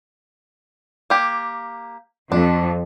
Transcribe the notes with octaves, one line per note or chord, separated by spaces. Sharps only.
A#3 G4
F2 D4